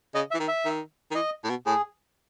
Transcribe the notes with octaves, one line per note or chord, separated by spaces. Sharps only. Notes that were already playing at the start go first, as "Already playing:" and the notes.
C#3 D#5
E5
E3
D#3
E5
D#3
D#3
E3 D#5
A2
B2
A2 G#4